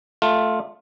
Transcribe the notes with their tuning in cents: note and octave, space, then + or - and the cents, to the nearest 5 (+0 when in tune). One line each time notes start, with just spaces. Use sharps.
A3 +0 F4 +10